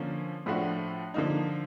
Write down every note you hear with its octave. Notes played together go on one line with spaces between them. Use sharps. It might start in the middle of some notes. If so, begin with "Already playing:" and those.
Already playing: D3 F3 A#3 C#4
A2 F3 A3 D4 F#4
D3 F3 A#3 D#4